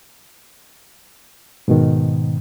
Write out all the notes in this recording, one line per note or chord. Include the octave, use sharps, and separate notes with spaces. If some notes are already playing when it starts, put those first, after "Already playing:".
G#2 B2 D#3